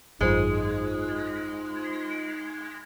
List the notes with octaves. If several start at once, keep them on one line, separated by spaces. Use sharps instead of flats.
G#1 F#2 G#3 D#4 F4 C5 D#5